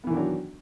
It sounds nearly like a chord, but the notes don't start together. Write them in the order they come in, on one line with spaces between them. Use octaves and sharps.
B3 E3 D#3 D4 F#3